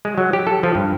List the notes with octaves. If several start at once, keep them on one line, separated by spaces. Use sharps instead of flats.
G#3
F#3
G4
A4
F3
G2